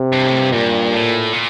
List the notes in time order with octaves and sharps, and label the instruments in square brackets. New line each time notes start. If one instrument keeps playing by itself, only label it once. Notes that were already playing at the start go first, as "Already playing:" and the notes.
Already playing: [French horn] C3
[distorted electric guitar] G2
A2
G2
[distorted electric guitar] G2 [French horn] A#2
[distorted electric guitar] A2
A#2